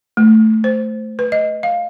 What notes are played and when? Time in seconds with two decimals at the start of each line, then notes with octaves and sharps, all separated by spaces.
0.17 A3
0.64 C5
1.19 B4
1.32 D#5
1.63 F5